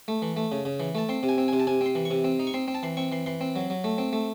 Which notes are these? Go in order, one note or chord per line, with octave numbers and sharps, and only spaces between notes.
A3
E3
A3
C#3
C#3
E3
A3 A5
C4 C6
C3
G#5
C4
C3 G#5
A5
C3 G#5
C4 C6
E3
C#6
C3
C4
D#4
C#6
C4 C6
C4
A5
E3 C6
C4 C#6
E3 C6
E3 C6
C4
F#3
F#3
A3
C4
A3